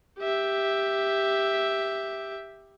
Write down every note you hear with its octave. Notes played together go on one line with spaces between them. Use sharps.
G4 E5